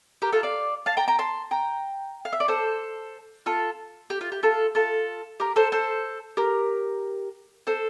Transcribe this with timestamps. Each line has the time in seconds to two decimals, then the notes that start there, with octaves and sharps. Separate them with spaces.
0.22 G4 A#4
0.32 F4 A4
0.43 D5 F5
0.86 F5 A5
0.97 G5 A#5
1.08 G5 A#5
1.19 A5 C6
1.51 G5 A#5
2.25 F5
2.33 E5
2.40 D5
2.48 A4 C5
3.46 F4 A4
4.10 G4
4.21 F4
4.32 G4
4.43 F4 A4
4.75 F4 A4
5.40 G4 A#4
5.56 A4 C5
5.72 A4 C5
6.37 G4 A#4
7.67 A4 C5